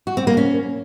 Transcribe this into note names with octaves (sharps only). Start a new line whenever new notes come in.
F#4
C4
A#3
C#4